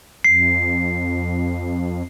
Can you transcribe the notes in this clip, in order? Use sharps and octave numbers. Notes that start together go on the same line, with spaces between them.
F2 C7